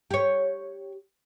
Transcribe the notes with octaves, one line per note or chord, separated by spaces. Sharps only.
G4 C#5